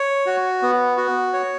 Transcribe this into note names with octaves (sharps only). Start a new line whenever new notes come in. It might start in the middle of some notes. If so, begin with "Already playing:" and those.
Already playing: C#5
F#4
B3
F#4
C#5